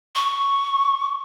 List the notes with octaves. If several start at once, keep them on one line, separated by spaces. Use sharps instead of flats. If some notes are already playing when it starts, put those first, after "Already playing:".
C#6